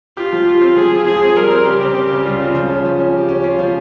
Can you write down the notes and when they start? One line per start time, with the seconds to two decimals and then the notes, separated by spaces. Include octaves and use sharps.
0.17 F4 G4
0.33 F3
0.47 G4
0.62 C4
0.77 F3 G#4
0.92 F3
1.06 F3 G#4
1.22 C4
1.36 G3 A#4
1.50 C4
1.66 C#3 G4
1.81 C4
1.95 C4
2.10 C#3
2.25 G3 F4
2.40 C#3
2.55 F3
2.70 C#4
2.85 F3
2.99 C#4
3.14 F3 G4
3.29 C#4
3.44 C#4 F4
3.59 F3